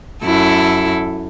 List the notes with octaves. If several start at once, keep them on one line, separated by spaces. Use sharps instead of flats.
F#2 E4 A4